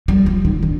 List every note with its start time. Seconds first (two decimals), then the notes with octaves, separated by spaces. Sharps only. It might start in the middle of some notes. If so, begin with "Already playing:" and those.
0.08 G3
0.26 F3
0.45 D#3
0.63 D3